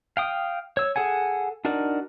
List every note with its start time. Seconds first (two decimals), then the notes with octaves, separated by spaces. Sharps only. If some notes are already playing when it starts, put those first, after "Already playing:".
0.17 F5 G5 D#6
0.77 C#5 E6
0.96 G#4 A4 F#5 G#5
1.65 D4 D#4 F#4 A#4 D5